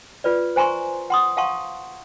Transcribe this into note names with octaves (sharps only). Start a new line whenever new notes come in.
F4 B4 D5
C5 G#5 A#5 C6 C#6
F#5 C6 D#6
F5 F#5 A5 C6 C#6